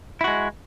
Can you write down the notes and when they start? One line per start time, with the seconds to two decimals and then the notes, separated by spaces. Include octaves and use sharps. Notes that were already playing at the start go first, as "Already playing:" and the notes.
0.21 E4
0.24 F#4
0.28 G#3